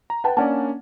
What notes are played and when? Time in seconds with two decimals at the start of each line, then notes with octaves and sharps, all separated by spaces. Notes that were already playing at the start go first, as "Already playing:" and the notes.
0.10 A#5
0.24 B4 F#5 G5 A5
0.37 A#3 C#4 D4 D5 F#5 A5